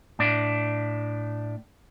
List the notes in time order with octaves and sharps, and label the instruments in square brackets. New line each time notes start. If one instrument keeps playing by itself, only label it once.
[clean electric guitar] A2 D4